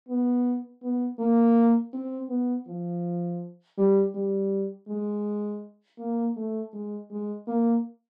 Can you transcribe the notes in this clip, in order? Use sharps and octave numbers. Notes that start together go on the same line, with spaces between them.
B3
B3
A#3
C4
B3
F3
G3
G3
G#3
A#3
A3
G#3
G#3
A#3